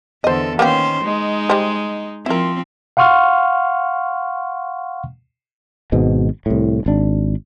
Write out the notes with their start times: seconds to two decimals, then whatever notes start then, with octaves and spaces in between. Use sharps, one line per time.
0.24 E2 D3 A4 C5 D#5
0.59 D#3 A#3 B3 C#4 G4 C5
1.03 G#3 D#4
1.50 G3 C5
2.26 F3 C4 E4 A#4
2.97 F5 F#5 C6 C#6 F6
5.92 G#1 G#2 B2
6.46 C2 A2
6.86 G#1 D4